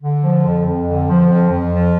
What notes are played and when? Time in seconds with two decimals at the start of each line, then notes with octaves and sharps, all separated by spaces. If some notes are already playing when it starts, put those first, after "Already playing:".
0.03 D3
0.24 F3
0.46 F2
0.66 F2
0.88 D3
1.09 F3
1.30 F2
1.50 F2
1.72 F3